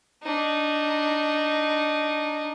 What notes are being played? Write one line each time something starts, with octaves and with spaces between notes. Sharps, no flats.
D4 D#4